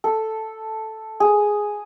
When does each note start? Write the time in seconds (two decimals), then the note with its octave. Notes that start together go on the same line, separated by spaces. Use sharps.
0.04 A4
1.20 G#4